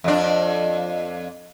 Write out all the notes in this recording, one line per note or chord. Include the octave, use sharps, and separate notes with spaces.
F2 D4